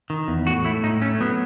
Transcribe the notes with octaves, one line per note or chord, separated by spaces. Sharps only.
D#3
E2
A2 F#4
A3 E4
A2 D#4
A3 C#4
F#3 B3